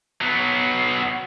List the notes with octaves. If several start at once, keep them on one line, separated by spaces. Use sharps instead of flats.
F#3 B3